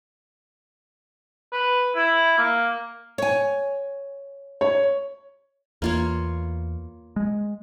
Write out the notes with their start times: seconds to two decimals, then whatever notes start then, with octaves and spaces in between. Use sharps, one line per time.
1.52 B4
1.96 E4
2.38 A#3
3.18 C#5 G#5
4.61 C#5
5.82 E2 A#3 F4 C#5
7.16 G#3